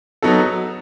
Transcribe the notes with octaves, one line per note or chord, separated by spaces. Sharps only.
F#3 B3 D#4 F#4 A4